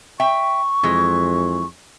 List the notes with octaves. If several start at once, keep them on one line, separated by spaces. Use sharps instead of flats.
E5 G5 C#6
F2 E3 G#3